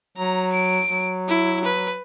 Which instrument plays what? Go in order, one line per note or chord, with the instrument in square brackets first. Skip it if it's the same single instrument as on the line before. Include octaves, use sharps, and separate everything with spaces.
[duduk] F#3 [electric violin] A#5
[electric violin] D7
[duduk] F#3
[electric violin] E4
B4